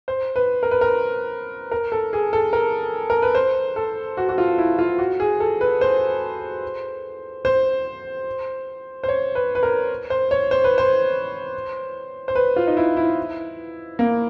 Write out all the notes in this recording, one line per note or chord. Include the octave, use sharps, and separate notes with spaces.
C5
B4
A#4
B4
A#4
A#4
A4
G#4
A4
A#4
A#4
B4
C5
A4
F#4
F#4
F4
E4
F4
F#4
G#4
A4
B4
C5
C5
C5
C#5
B4
B4
A#4
C5
C#5
C5
B4
C5
C5
B4
F4
D#4
E4
E4
A#3